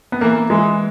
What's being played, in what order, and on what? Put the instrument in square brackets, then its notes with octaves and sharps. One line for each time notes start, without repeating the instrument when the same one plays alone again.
[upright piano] B3
[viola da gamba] E3 [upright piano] A#3
[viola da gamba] E3 [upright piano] G#3